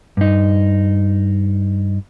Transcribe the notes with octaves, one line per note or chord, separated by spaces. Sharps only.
G2 D#4